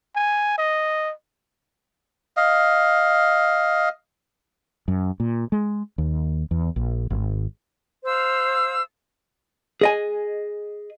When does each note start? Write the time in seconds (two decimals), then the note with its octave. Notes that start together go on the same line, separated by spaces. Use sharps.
0.16 G#5
0.58 D#5
2.37 D#5 F5
4.88 F#2
5.20 A#2
5.52 G#3
5.98 D#2
6.51 E2
6.76 A#1
7.10 G#1
8.05 C5 F5 E6
9.81 G#4 D#5 G#5